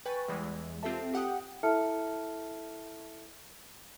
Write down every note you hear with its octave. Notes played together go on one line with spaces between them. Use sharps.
B4 G5 G#5 C#6 A6
E2 E3 G3 G#3
C4 F4 G4 A4 E5 A5
G4 F#5 G5 D#6
E4 A4 E5 A5 F6 C#7